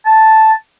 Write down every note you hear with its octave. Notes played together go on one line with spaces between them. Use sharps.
A5